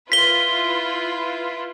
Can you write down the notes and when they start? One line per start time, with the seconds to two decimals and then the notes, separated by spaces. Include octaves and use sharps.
0.12 E4 F4 B4 B6 G7